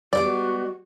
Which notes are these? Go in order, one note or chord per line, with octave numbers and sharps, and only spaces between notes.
G3 G#3 B3 F#4 D5